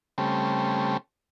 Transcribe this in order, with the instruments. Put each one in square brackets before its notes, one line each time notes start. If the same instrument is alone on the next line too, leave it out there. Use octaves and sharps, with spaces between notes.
[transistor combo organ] C#3 G3 A3 C4